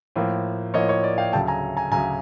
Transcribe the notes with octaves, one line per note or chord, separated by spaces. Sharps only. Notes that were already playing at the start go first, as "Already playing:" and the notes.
A2 F3 A#3
A2 F3 A#3 C#5 D#5
C#5
D5
F5 G5
D2 C#3 F#3 G5 A5
G#5 A#5
G#5 A#5
D2 C#3 F#3 G#5 A#5